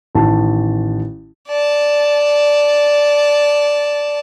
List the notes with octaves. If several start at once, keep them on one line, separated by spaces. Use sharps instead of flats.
A1 D#3 A5
D5 A5